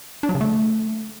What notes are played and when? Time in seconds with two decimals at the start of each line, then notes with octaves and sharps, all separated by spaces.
0.23 D4
0.29 F#3
0.35 C#3
0.41 A3